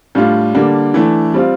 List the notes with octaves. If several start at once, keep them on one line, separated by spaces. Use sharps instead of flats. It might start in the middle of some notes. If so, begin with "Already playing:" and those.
A2 G3 D4 F4
D3 G3 A#3 D4
E3 A3 D4
G3 C4 F4